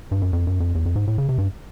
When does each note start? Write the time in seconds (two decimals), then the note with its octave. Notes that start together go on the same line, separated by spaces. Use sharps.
0.11 G2
0.22 F#2
0.33 F2
0.47 F#2
0.60 F2
0.75 E2
0.86 F2
0.96 G#2
1.07 A2
1.18 C#3
1.29 C3
1.38 G2